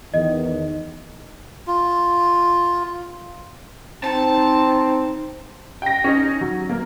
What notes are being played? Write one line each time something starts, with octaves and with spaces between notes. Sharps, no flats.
E2 D#3 D#5
F4
C4 D#4 A5
G5 A#6
C#4 D#4
F#3
A#3 A#4